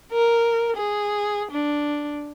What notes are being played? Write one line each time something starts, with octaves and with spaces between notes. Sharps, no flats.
A#4
G#4
D4